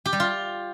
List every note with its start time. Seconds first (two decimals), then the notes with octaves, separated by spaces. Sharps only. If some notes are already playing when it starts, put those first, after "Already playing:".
0.06 G4
0.13 G3
0.20 F4